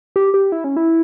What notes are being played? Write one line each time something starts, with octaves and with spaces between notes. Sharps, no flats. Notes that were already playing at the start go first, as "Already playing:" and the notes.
G4
G4
E4
C#4
E4